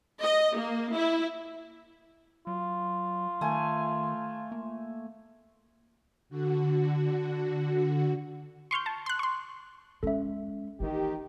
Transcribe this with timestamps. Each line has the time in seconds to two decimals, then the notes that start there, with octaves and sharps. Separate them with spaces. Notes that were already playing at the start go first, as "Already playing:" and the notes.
0.21 D#5
0.56 A#3
0.95 E4
2.47 F#3 F4
3.41 D#3 A3 G#5
4.52 A#3
6.29 D3 F#4
8.71 C6 C#6 F6 G6
8.86 A5
9.06 C6 F#6
9.19 C6 C#6
10.03 G#3 C#4 A4 E5
10.80 D#3 E3 A#3 D#4 G4